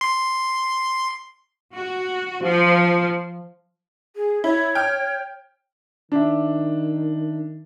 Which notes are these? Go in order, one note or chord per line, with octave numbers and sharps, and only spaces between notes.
C6
F#4
F3
G#4
E4 C#5
G5 F6
D#3 D4 E5